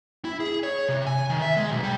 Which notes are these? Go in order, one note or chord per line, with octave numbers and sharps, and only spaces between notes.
E4
G#4
C#5
C3
G#5
D#3
E5
G#3
B1
G3